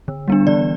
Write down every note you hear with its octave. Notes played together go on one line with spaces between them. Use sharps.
D3
G3 B3 D4
E3 D5